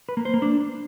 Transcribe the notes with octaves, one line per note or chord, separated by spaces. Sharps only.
B4
A#3
C5
A#3
D4